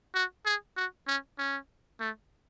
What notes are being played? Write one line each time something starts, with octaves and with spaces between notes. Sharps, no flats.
F#4
G#4
F#4
C#4
C#4
A3